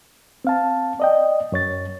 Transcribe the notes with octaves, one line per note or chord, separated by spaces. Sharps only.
C4 F5 A5
D5 D#5 G5
F#2 C#5 A6